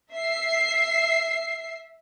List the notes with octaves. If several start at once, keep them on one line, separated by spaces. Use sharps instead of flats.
E5 C7